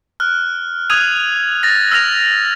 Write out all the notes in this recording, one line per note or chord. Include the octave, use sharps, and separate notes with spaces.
F6 F#6
D#6 E6 F#6 G#6 D#7 F7
A6 A#6
E6 F6 A#6 F7